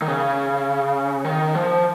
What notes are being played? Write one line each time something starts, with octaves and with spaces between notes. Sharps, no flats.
D#3
C#3
D#3
F3